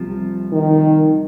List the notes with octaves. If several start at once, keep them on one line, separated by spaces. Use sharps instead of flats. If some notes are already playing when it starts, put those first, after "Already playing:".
Already playing: C2 C3 F3
D#3